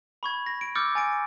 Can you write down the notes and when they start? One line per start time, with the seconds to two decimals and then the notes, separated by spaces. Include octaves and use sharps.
0.23 B5 C#6 G#6
0.46 A#6
0.61 D7
0.75 D6 E6 F6 G6 A6 C#7
0.95 G#5 A6 D7